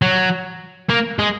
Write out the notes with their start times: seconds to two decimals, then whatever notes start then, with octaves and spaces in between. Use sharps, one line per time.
0.02 F#3
0.90 A#3
1.19 G#3